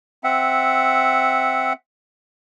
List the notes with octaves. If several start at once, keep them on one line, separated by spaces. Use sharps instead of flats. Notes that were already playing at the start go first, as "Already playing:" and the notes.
C4 E5 F#5